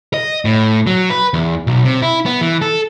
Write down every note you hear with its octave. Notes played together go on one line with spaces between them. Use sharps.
D#5
A2
F#3
B4
E2
B1
C3
E4
B3
E3
A4